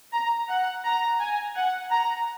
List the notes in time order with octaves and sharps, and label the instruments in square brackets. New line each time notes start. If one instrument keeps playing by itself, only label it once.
[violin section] A#5
F#5
A#5
G#5
F#5
A#5